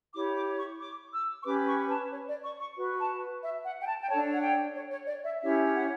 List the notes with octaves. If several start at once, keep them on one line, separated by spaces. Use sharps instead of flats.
E4 G4 C#5 D6
D6
C#6
D6
E6
C#6
C#4 G4 B4 D6
C#6
A5
C#5
D5
C#6
C#6
F#4 B4
A5
E5
F#5
G5
A5
G5
D4 A4 C#5 A5
F#5
G5
C#5
C#5
D5
E5
C#4 E4 G4 C#5 E5
F#5